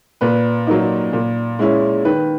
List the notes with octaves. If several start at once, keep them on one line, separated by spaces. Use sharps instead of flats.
A#2 B4
F#3 A#3 D#4
A#2
G#3 C#4 E4
D#3 B4